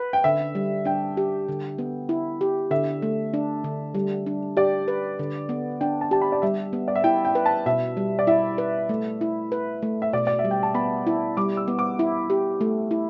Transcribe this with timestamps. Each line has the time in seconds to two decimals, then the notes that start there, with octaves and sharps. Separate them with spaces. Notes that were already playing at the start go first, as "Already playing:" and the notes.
Already playing: B4
0.13 G5
0.24 D3 E5
0.55 G3
0.85 D4 G5
1.17 G4
1.48 D3
1.78 B3
2.09 E4
2.41 G4
2.71 D3 E5
3.02 A3
3.34 D4
3.64 D3
3.95 G3
4.26 D4
4.57 G4 D5
4.88 B4
5.19 D3
5.49 B3
5.81 D4 G5
6.01 A5
6.11 G4 A5
6.22 B5
6.32 D5
6.42 G3 E5
6.73 B3
6.88 D5
6.96 E5
7.04 E4 G5
7.25 G5
7.35 B4
7.46 A5
7.66 B2 E5
7.97 G3
8.19 D5
8.27 E4 E5
8.58 B4
8.89 A3
9.21 E4
9.52 B4
9.82 A3
10.02 E5
10.13 B2 D5
10.27 D5
10.39 E5
10.45 G3
10.51 G5
10.63 A5
10.75 B3 B5
11.07 E4
11.37 G3 D6
11.57 E6
11.68 B3
11.79 D6
11.99 E4
12.30 G4
12.61 A3
12.91 E4